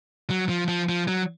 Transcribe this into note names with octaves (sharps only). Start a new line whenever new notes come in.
F#3
F3
F3
F3
F#3